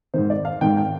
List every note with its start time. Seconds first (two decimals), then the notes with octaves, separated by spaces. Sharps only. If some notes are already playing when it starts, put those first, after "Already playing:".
0.14 G#2 D#3 C5
0.30 D5
0.45 F5
0.61 G#2 D#3 G5
0.77 G5